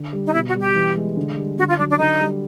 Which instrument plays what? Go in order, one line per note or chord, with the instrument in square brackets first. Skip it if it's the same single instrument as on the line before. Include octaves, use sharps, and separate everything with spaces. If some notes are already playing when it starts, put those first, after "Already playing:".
Already playing: [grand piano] D3
G3
[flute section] D#4
[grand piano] B2 [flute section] E4
[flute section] F#4
[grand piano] G3
[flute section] G4
[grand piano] E3
G#3
D3
G3
[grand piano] D3 [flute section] F#4
[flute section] F4
[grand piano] F#3 [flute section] D4
[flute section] D4
[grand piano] D3 [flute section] D#4
[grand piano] G3